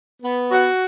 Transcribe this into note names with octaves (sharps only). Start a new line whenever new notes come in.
B3
F#4